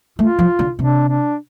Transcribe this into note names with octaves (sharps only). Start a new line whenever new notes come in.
A3 F4
F3
D3
C3 D4
D4